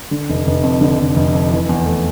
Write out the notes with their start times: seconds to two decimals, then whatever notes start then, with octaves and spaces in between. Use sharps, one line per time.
0.11 D3
0.29 F1
0.47 F1
0.63 F2
0.81 D3
0.99 F1
1.16 F1
1.33 F2
1.51 E3
1.69 E2
1.86 A3